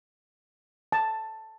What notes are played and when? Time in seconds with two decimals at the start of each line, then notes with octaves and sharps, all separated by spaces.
0.92 A5